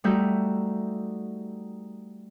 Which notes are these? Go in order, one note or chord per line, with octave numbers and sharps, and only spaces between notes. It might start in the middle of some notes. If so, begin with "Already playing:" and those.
G3 A3 D#4 F#4 E5 G6